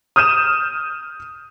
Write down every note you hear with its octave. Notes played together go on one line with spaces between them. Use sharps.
D#6 F6 G6 D#7 E7